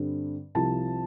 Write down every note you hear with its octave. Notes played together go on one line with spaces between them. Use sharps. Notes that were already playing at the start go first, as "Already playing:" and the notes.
Already playing: G2 D3 G3 C4
C2 C3 F3 A5